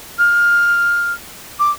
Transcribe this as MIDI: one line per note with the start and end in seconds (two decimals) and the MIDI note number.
0.18 1.13 89
1.59 1.71 86